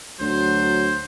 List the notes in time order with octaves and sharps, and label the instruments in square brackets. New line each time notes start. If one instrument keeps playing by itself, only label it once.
[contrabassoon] D2 [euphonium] F#3 [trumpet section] C5